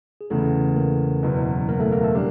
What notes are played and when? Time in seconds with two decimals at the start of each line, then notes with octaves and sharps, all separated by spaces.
0.21 G#4
0.30 E2 C#3 E3 A3 A4
0.76 A#3 A#4
1.23 F#1 E2 B2
1.69 A#3 A#4
1.80 A3 A4
1.92 A#3 A#4
2.03 A3 A4
2.15 G3 A#3 D4 G4